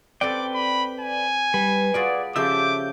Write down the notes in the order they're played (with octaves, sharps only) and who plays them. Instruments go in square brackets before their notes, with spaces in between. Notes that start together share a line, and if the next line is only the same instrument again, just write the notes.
[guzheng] C4 G4 A4 [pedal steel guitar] B4 G5 [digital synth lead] D5 [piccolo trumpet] D6
[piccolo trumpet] B5
G#5
[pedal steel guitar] G3 [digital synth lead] B4
[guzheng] F4 F#4 G#4 [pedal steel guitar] D5
[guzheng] C#3 F3 A3 [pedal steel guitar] G4 E5 E6 [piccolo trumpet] D6 [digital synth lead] G6